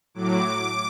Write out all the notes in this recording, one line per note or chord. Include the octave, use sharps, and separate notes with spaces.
A2 F#3 D6